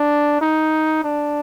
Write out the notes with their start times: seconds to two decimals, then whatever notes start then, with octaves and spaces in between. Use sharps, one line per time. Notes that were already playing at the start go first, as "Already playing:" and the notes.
Already playing: D4
0.41 D#4
1.04 D4